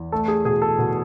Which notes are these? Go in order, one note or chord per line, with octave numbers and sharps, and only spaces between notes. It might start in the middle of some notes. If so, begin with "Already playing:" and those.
Already playing: E2
A3 A4
G#4
B2 G#4
A4
B2